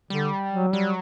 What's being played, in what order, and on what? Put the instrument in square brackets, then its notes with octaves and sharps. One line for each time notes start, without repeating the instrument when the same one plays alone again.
[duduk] D3 [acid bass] G3
[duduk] F#3
[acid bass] F#3 [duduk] G3